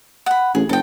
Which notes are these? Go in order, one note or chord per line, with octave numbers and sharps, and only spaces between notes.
F#5 B5
A1 G#4
F#1 A4 G5